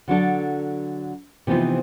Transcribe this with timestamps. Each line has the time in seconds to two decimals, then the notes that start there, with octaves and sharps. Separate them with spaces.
0.08 D3 F#3 D4 A4
1.47 C3 E3 F3 B3 D#4 F4